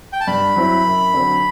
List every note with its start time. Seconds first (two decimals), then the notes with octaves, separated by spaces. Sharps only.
0.13 G5
0.21 A5
0.27 G2 B5
0.56 F#3 C4 E4
0.85 F#2
1.14 D3 F#3 C4